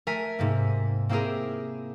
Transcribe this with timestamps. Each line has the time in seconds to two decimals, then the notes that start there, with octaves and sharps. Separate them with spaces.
0.07 A3 A#4 G#5 B6
0.39 G#2 C3 A#3
1.09 A#3 C4 E4 G4 G#4 A#4